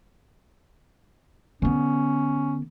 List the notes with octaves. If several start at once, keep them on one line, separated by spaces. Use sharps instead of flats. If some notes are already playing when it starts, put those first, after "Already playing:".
D3 B3 C#4